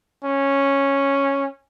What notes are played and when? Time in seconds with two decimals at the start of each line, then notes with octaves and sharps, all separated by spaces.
0.25 C#4